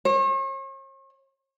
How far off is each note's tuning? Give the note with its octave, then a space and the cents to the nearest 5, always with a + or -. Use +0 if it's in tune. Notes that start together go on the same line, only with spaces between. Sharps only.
C#5 -45